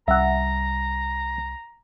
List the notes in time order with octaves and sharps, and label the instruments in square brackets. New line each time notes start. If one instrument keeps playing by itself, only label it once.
[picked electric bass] C2 G3 C#4 [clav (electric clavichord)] E5 F#5 [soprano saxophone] A#5